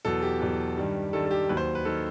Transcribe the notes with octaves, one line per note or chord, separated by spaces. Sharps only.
E2 B2 F#3 A4
G4
E2 B2 F#3
G2 D#3 G3
G2 D#3 G3 A4
A4
G4
D#2 D#3 F#3 B4
C5
B4
D#3 F#3 A4